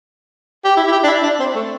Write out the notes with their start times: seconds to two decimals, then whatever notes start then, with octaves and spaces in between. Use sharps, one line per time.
0.65 G4
0.77 E4
0.88 E4
0.92 G4
1.04 D4
1.07 E4
1.23 D4
1.40 C4
1.55 A3